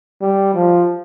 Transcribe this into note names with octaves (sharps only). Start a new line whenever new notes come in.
G3
F3